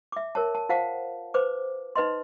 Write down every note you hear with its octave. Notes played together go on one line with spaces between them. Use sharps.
E5 D6
A#4 C#5 A5
A5
F4 C5 F5 F#5 A5
B4 C5 D6
D#4 B4 D#5 C6